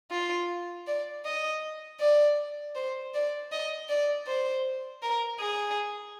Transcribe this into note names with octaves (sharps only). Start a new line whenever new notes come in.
F4
D5
D#5
D5
C5
D5
D#5
D5
C5
A#4
G#4